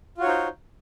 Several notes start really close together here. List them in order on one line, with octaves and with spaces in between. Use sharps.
F4 F#4 C#5 D#4 C5